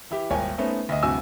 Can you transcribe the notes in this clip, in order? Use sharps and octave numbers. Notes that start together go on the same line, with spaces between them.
E3 E4 G4
D#1 G#1 C#5 G5 G#5
A3 B3 C#4 D#4 C5
D2 D#5
D1 G2 C3 F#4 G#5 E6